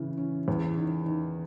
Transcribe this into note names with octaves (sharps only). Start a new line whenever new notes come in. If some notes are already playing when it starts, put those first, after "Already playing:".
Already playing: C#3 E3
C#4
E2
D#3
D#3